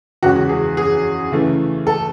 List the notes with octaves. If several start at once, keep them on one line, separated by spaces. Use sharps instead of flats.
E2 C#3 G#3 C#4 F#4
F#4
G#4
G#4
C#3 E3 A3
A4